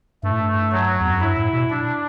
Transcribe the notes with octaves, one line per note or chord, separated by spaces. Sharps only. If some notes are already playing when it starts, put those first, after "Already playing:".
G2 A3
A2
G2
F#3
E2
F#2
G2 E4
A2
B2
D4